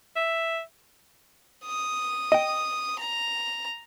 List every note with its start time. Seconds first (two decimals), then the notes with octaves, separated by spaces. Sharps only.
0.16 E5
1.65 D#6
2.32 D#5 G5
2.99 A#5